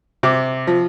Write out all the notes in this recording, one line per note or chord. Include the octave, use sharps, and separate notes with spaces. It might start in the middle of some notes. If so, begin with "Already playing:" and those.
C3 D6
F3